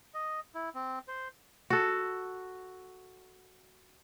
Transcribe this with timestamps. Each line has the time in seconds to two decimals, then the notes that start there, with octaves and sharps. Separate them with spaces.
0.14 D#5
0.55 E4
0.75 C4
1.08 C5
1.70 F#4 A4